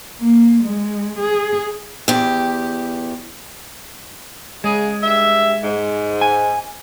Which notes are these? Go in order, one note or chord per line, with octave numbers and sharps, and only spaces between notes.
A#3
G#3
G#4
E2 G4
C#3 G#3 G#4
G2 G4 E5
G#2
G#5